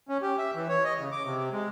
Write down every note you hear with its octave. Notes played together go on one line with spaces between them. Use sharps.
C#4
G4
E5
E3
C#5
D#5
C#3
D6
C3
G#3